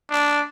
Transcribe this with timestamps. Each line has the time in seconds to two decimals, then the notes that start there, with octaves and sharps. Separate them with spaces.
0.11 D4